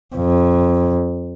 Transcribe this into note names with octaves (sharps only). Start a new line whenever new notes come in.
F2